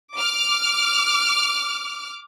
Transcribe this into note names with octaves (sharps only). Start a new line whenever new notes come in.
D6 F6